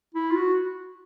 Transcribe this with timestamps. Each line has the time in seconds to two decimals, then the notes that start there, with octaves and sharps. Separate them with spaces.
0.15 E4
0.31 F4
0.35 F#4